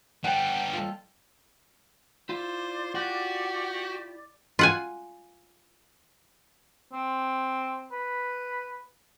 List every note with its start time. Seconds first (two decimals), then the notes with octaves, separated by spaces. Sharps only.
0.24 G3 B3 F#5 G5 A5 E7
0.73 F4 A4
2.29 E4 F4 C5 D5
2.95 F#4 G4
4.59 F4 F#5 G#5
6.93 C4
7.92 B4